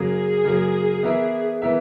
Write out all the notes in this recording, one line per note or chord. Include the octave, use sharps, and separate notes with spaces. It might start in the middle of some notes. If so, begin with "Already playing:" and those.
Already playing: F#2 C#3 F#3 A#3 G#4
F#2 C#3 F#3 A#3
E3 B3 E4 A#4 E5
E3 B3 E4 A#4 E5